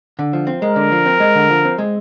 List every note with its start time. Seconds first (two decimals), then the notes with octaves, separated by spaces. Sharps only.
0.19 D3
0.33 F3
0.47 C4
0.62 G#3 A#4
0.76 D3
0.92 F3
1.06 C4
1.20 G#3
1.35 D3
1.50 F3
1.65 C4
1.78 G#3